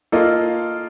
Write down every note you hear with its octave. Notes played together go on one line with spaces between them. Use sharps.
A#3 F4 A4 D#5